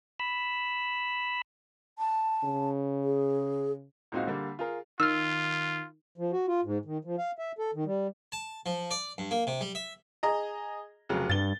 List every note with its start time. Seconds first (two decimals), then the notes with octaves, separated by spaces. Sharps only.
0.20 B5 E6
1.99 A5
2.44 C#3
3.04 G#4
4.12 C#2 A#2 C4 D#4 F#4 F5
4.27 D3 G3 A#3
4.59 F4 G#4 A#4
5.00 D#3 F4 E6 F6
6.18 F3
6.32 F#4
6.48 F4
6.64 G#2
6.85 D#3
7.05 F3
7.18 F5
7.38 E5
7.59 A4
7.74 D#3
7.86 G3
8.32 A5
8.66 F3
8.91 D5
9.18 G2
9.31 A#3
9.47 C3
9.61 G3
9.75 E5
10.23 G#4 D#5 A#5
11.09 F1 C#3 F#3
11.30 G2 A6 G7